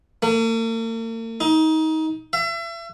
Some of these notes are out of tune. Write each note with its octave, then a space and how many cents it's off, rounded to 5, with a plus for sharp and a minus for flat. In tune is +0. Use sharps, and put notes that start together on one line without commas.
A#3 -45
D#4 +25
E5 +35